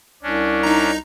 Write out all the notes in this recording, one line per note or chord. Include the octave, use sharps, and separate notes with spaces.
C2 C#4 D4
D#4 A#5